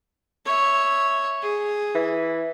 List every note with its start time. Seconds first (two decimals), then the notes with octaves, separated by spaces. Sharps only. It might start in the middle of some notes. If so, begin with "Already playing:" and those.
0.45 C#5 E5
1.42 G#4
1.95 E3